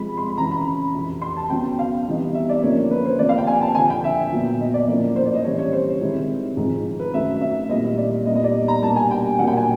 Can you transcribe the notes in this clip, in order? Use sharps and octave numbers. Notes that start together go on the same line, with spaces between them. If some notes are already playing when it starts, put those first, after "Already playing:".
Already playing: C3 F3 G#3 B5
C6
B5
F#2 C#3 E3 A#5
B5
F2 C3 E3
C6
A5
C#3 F#3 B3 G5
F5
C3 E3 G3 B3 D#4
E5
D5
D3 F3 A#3 C#4 C#5
B4
C5
C3 F3 A#3 D5
F5
G5
G#5
A5
F2 D3 F3 G#5
G5
E5
A#2 F#3 B3
D#5
D5
A2 F3 A#3 C#4
C5
D5
D#5
C#3 E3 G3 C4 C#5
C#5
C5
C3 D#3 G#3 C4 E4
G#2 F3 G#3
B4
F#2 D#3 F#3 A3 C4 E5
E5
A#2 G3 C4 E4 D#5
D5
A#2 G3 B3 D#4 D#5
D#5
D5
A#5
B2 G3 A#3 D4 A5
G#5
G5
A#2 F#3 A#3 D4 F#5
G5
G#5